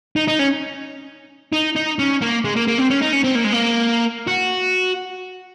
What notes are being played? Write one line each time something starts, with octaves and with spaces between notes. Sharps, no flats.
D#4
D#4
C#4
D#4
D#4
C#4
A#3
G#3
A#3
A#3
C4
C#4
D#4
C#4
C4
A#3
G#3
A#3
F#4